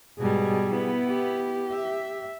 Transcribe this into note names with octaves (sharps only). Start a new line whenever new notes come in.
G#2 B2 G3 G#4
B3 E4
G4
E5